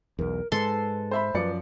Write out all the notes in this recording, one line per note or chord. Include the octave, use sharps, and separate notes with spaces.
B1 E2 A#4
G#2 G#3 A4 B4 C6
C5 E5 B5
F#2 F3 B4 D5 C#7